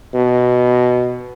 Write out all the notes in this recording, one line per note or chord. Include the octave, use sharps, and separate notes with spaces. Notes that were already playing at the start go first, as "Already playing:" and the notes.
B2